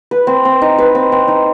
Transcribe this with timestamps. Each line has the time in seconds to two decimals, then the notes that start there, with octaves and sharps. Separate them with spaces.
0.11 B4
0.27 C4
0.45 C4
0.62 D#4
0.78 B4
0.95 C4
1.12 C4
1.28 D#4